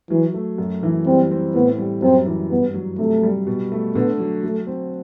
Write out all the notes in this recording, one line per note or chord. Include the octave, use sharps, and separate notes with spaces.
E3 F#3
A3
F#2
E3
G3 C4
C4
A2 B3
G3
F#2 C4
E3
G2 B3
F#3
C3 A3
G3
B2
A3
D3 B3
F#3
F#3 A3
C4